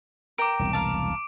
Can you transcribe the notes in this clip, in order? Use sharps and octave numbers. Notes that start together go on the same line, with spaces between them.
A#4 G5 D6 D7
E1 C2
A#4 F5 A5